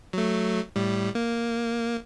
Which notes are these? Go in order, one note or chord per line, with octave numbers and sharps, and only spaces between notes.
F#3 A3
A2 G3
A#3